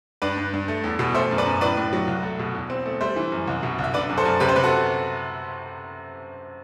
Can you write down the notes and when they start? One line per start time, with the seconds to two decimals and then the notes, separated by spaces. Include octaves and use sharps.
0.22 G2 B4 D5
0.37 G2
0.53 G2
0.68 A3
0.84 E2
0.99 B2
1.14 A3 C5 E5
1.31 F#2
1.38 B4 D5
1.46 F#2
1.61 A2 B4 D5
1.77 A2
1.93 F#3
2.07 C2
2.23 A3
2.39 B2
2.55 E2
2.70 C4
2.86 A3
3.01 G3 C5 E5
3.16 E3
3.32 F#2
3.47 C2
3.63 B2
3.79 C2 E5
3.94 D3 B4 D5
4.09 F#2
4.18 A4 C5
4.25 F#2
4.40 C3 G4 B4
4.49 C5
4.56 C3 B4
4.63 F#4 A4